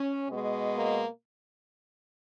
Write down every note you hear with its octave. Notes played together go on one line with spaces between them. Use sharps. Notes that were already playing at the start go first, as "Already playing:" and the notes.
Already playing: C#4
B2 G#3
A#3